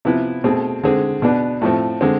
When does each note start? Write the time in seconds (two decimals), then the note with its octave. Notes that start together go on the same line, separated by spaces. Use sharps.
0.05 C3 F3 B3 E4
0.44 B2 A3 C4 G#4
0.83 D3 G#3 C4 G#4
1.22 B2 B3 D4
1.61 A2 F3 A3 C4
2.01 D3 G#3 C4